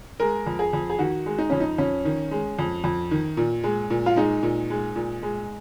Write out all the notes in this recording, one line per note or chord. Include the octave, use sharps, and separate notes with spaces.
G#3 A#4
F2
G#4
F2
G#4
D#3 F#4
G#3
D#4
F2 C#4
D#4
F2 C#4
D#3
G#3
F2
F2
D#3
A#2
G#3
A#2
F4
G#3 D#4
A#2
G#3
A#2
G#3